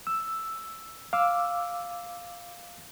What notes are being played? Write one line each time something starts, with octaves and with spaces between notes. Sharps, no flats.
E6
F5 D6 E6